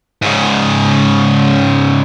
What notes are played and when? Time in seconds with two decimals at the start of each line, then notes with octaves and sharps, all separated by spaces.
0.22 G#2 C#3